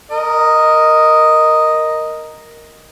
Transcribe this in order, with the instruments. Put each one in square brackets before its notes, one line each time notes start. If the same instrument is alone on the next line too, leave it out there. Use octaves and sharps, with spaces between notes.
[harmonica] A#4 D#5